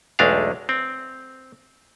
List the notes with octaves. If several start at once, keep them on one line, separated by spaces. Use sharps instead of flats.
B1 E2 G#3 A3 D4 F5
C4